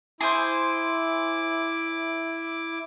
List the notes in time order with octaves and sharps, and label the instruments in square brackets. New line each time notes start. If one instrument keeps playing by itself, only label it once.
[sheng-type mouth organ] E4 D6 [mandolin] G#4 C5